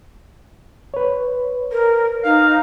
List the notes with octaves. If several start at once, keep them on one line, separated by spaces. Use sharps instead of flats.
B4 C#5
A#4
D#4 F5